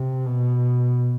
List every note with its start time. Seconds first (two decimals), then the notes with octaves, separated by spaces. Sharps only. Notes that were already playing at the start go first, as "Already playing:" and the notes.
Already playing: C3
0.26 B2